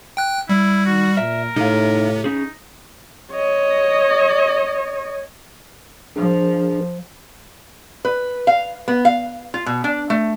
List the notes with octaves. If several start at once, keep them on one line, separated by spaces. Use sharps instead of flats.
G5 F#6
G3 E4
D#3 F#4
A#2 A#4 E5
A2 C3 D#4 F5
C#4 D#4 G#4
C#5 D#5
F3 D4 G#4 A#4
B4
F5
B3
F5
F4
B2
D4
A3